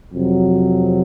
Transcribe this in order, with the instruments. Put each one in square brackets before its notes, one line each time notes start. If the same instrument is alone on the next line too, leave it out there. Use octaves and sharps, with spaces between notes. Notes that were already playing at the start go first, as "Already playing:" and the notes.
[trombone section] F2 C3 F#3